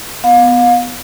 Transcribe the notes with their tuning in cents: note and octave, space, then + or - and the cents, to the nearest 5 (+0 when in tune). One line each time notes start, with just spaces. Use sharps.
B3 +10 F5 +35